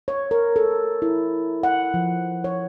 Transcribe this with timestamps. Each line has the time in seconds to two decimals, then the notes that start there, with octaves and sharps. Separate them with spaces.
0.08 C#5
0.31 A#4
0.56 A4
1.02 E4
1.63 F#5
1.94 F3
2.44 C#5